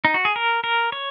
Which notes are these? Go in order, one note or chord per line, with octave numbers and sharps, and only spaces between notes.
D#4
F#4
G#4
A#4
A#4
C#5